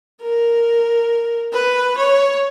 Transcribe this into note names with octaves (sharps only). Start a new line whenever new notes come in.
A#4
B4
C#5